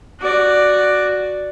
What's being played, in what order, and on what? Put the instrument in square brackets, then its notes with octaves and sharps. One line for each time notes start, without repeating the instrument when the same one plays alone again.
[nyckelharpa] F#4 D5